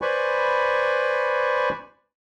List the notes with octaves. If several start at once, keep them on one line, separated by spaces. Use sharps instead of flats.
B4 C5 D5 G#5 B5 C#6